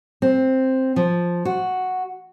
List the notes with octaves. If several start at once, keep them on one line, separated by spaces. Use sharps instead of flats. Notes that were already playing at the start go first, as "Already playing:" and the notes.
C4
F3
F#4